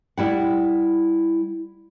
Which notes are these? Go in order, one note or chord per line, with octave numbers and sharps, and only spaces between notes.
G3 E4 F#5